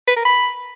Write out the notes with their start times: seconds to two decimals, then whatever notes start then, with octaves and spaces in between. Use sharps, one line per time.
0.08 B4
0.16 A#4
0.25 B5